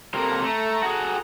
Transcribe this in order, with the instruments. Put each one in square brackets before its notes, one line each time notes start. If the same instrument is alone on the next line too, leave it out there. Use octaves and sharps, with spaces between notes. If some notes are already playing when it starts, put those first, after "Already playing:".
[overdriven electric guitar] C3 A#3 [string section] A4 A#5
[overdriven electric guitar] A3
F#4 G#4